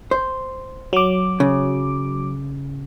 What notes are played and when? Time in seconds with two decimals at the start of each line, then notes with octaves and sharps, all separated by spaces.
0.11 C5
0.93 F#3 D6
1.40 C#3